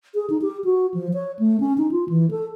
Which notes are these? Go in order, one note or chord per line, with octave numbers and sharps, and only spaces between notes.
G#4
D#4
G4
F#4
F3
C#5
A3
C#4
D#4
F4
E3
A4